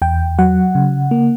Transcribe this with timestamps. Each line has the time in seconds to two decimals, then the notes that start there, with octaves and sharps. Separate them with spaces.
0.02 E2 G5
0.39 F#3 F#5
0.75 C#3
1.11 A#3